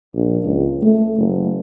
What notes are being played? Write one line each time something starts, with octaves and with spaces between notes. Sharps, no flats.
A#1
C#2
A3
F#1